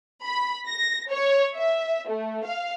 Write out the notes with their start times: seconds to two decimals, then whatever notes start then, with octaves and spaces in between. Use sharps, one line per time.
0.24 B5
0.68 A#6
1.10 C#5
1.53 E5
2.08 A3
2.45 F5